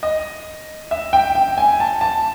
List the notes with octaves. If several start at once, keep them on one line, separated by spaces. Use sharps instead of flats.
D#5
E5
G5
G5
G#5
A5
A5